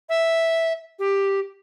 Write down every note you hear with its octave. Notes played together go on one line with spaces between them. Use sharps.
E5
G4